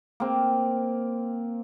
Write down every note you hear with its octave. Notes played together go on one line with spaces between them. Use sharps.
A#3 C4